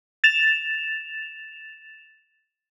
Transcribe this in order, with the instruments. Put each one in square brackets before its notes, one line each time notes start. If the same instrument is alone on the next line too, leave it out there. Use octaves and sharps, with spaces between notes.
[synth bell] A6 E7 F7